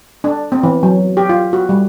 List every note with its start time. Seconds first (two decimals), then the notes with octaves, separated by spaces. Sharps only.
0.24 D4
0.52 C4
0.63 E3
0.83 F#3
1.17 G4
1.29 F4
1.53 F#4
1.69 G3